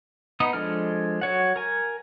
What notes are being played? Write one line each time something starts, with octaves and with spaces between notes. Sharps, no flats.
B3 D#4 D#6
F3 G#3 D4 A4 F6
F#3 C#5 F#5
A#4 G#5